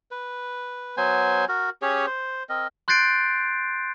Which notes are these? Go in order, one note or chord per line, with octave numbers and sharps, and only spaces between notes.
B4
F#3 B3 C5 G#5
F#4 A#4
C#4 G4 G#4 C#5
C5
C4 A#4 D#5
C6 F#6 G6 A6 C7 D7